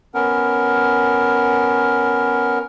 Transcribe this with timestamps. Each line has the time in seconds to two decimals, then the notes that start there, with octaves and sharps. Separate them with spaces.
0.14 B3 C#4 A#4